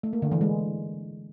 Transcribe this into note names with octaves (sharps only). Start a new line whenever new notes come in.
A3
A#3
D3
E3
G#3